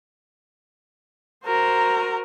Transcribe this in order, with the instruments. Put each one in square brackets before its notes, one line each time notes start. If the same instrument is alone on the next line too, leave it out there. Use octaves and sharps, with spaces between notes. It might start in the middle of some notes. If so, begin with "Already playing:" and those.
[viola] F#4 A#4 [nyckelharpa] C5 A#5